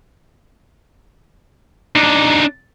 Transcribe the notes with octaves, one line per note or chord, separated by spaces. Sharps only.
D4 D#4